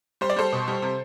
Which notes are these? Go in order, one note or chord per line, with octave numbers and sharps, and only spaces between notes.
G3 C5
D5
G3 A4 C5
B2
G3
C3